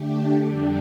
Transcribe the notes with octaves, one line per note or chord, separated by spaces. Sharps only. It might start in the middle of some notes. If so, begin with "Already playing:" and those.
Already playing: D3 A3 D4 G4
F2 D3 G3 D4 G4